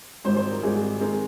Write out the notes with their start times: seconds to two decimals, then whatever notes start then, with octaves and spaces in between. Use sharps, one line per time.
0.24 G#1 G#2 G3 C4 C5
0.37 C5
0.50 A#4
0.63 G#1 G#2 G3 C4 G#4
1.00 D#3 G#3 C4 A#4